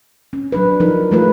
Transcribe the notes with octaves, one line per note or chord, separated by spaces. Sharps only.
C#4
F#3 D4 B4
F3 D#4 A#4
F3 G#3 A3 F4 B4